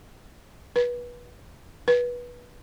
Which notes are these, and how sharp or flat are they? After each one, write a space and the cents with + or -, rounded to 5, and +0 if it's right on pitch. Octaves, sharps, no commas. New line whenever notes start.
B4 -25
B4 -20